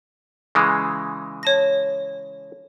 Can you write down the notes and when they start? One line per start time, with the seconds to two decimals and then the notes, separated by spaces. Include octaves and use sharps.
0.55 C#3 E3 G#3
1.43 C#5 A5 A#6